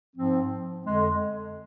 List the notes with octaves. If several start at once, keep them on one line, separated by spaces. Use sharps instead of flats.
G#2 F3 C4
F2 D3 G#3